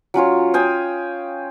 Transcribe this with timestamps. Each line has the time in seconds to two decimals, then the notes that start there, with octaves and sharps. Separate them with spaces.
0.14 F#3 C#4 F4 C#5
0.54 F5 G5 G#5 D#6